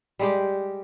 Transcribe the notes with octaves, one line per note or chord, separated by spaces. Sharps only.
G3 G#3 G4